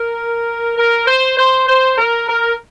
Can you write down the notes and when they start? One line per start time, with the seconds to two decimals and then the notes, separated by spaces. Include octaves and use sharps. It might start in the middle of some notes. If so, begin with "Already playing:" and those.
Already playing: A#4
0.77 A#4
1.08 C5
1.37 C5
1.67 C5
1.98 A#4
2.28 A#4